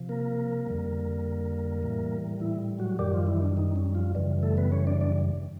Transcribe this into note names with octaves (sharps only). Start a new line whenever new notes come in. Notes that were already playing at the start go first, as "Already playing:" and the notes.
Already playing: C3 F3
A#3 A#4
F2 D3 G3
A2 E3 G3
E3 E4
F#3 F#4
F#2 D#3 G3 G4
F3 F4
E3 E4
D4
D#3 D#4
C#4
F3 F4
F#2 C#3 E3 G3
A3 A4
B3 B4
C#4 C#5
D4 D5
D4 D5